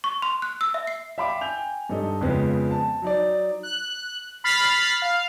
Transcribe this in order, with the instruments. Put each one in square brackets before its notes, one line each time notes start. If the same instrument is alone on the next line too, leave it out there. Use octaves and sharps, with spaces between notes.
[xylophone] C#6
C6
F#6
E6
E5
C7
[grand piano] E5 F5 G5 B5 C6 D6
G5 G#5 G6 F7
G2 D#4 A4 D#5
F2 C#3 F3 G#3 B3
A5
F#3 D#4 D5
[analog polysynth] F#6
B5 F6 A6 C7
F5